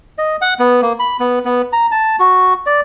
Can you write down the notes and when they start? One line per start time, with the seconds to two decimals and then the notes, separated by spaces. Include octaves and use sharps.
0.18 D#5
0.42 F#5
0.59 B3
0.82 A#3
0.99 B5
1.20 B3
1.45 B3
1.73 A#5
1.92 A5
2.20 F#4
2.66 D5